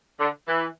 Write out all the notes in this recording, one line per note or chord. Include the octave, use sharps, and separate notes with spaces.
D3
E3